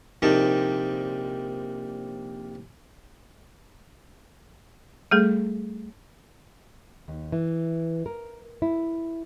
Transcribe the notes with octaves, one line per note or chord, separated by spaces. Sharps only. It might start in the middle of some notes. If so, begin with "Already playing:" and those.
A#1 C3 A#3 D#4 G5 A5
G3 A3 G#4 A4
D#2
E3
A#4
E4